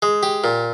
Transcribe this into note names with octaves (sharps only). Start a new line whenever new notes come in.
G#3
G4
A#2